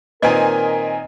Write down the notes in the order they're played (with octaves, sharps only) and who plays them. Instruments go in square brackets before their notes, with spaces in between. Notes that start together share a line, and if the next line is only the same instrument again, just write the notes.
[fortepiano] A#2 D#3 C4 [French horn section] A#4 [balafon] B4 [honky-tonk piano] D#5 G#5